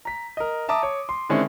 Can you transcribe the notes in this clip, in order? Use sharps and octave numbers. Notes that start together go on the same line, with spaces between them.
A#5 B6
A#4 D#5
E5 A5 A#5 D6 D#6
C#5
C6
D3 D#3 G#3 C4 C#4 E4